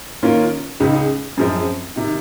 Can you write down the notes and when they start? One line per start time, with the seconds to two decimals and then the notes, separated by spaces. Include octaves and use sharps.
0.23 D#3 A#3 C#4 F4 A#4
0.80 C#2 C#3 G#3 D#4
1.37 F#2 F3 G#3 C4
1.96 C3 D#3